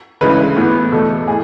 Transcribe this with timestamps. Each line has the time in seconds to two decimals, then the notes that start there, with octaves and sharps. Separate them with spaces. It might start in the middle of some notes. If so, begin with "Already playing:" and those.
0.21 D2 C#3 E3 G#3 B4
0.56 A2 E3 B3
0.92 E2 B2 A3 A4
1.27 A2 G#4